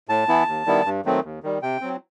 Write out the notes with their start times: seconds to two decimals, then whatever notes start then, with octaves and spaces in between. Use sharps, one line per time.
0.09 A2 A5
0.28 E3 B3 E4
0.48 D#2
0.66 D#3 G3 B3 E4
0.86 G2
1.05 D#3 F#3 A3 C4
1.24 D#2
1.43 D#3 G3
1.62 C3 G5
1.81 F#3 C4